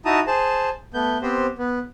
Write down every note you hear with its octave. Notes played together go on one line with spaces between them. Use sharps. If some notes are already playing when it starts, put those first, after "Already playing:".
D#4 E4 F#4 A5 A#5 D#6
G#4 C5 A5
A3 B3 G6
B3 C4 G4 C5
B3